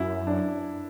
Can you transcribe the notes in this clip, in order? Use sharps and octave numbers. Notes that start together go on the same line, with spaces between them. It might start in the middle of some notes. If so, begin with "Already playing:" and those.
Already playing: F#2 E4
D4